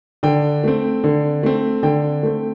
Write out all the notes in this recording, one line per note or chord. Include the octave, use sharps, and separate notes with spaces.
D3 G5
A3 C4
D3
A3 C4
D3 G5
A3 C4